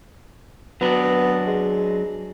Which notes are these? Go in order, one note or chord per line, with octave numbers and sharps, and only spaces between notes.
F#3 B3 D4
G#3